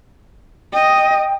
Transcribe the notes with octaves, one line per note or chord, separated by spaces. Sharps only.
D#5 G5